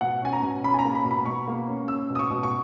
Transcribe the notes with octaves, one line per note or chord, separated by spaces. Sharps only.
B2 F#5
C#4 G#5
A#5
B2
C#4 B5
G#5
A#5
A#3
B5
B2
B5
B2 C#6
A#3
C#4
C#4 E6
B2
D#6
C#6
B2
C#6